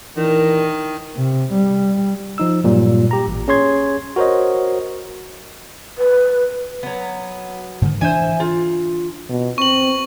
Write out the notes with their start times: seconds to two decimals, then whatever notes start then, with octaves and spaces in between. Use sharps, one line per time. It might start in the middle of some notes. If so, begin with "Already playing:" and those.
0.17 A#2 D#3 E3 D4 A#4
1.16 C3
1.53 G3
2.38 F3 D#4 E6
2.64 G2 A#2 F#3 G3
3.11 G4 A#5
3.28 A1
3.48 C#4 G#4 C#5 C6 G#6
4.16 F#4 A#4 C5 C#5 D#5
5.98 B4
6.83 F#3 B3
7.82 G#2 D3 D#3
8.01 E3 D4 C5 E5 G#5
8.40 F4
9.29 B2
9.58 C4 C#6 F#7